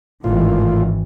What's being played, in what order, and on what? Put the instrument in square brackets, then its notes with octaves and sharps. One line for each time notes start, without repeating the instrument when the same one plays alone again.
[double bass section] G#1 D#3 E3 [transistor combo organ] A2 F4